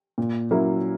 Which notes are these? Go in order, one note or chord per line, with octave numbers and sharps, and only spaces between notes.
A#2
F#3 A#3 C#4 E4